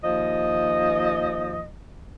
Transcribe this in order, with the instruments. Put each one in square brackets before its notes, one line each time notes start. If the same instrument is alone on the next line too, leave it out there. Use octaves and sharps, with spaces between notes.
[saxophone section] D#2 F3 D#5